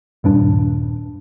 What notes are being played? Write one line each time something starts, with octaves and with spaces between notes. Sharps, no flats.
D#1 G2 D4